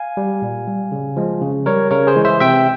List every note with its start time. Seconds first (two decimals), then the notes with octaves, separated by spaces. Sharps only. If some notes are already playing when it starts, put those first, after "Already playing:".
Already playing: F5 G#5
0.17 G3
0.42 A#2
0.68 G3
0.92 C#3
1.17 F3 G#3
1.42 C#3
1.66 G3 A#4 C#5
1.91 C#3 A#4 C#5
2.07 G#4 C5
2.16 E3 G#3
2.25 C5 E5
2.40 C3 E5 G5